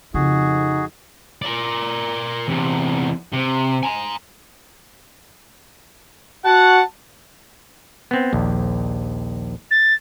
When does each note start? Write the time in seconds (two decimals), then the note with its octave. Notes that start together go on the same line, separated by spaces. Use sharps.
0.14 F2 C#3 D#4 F#4 G#4
1.42 A#4 D5
2.48 E2 C3
3.32 C3
3.83 G#5 A#5
6.45 F#4 F#5 A5
8.11 B3 C4
8.33 A#1 D#2
9.71 A6